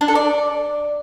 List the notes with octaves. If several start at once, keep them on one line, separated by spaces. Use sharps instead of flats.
D4
A4
D5